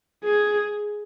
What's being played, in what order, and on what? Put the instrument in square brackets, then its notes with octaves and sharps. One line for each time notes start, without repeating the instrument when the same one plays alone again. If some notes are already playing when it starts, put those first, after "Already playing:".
[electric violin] G#4